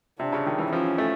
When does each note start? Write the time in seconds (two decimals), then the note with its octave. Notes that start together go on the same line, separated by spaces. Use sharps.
0.19 C3 D4
0.33 C#3
0.47 D#3
0.59 E3
0.72 F3 C#4
0.98 A3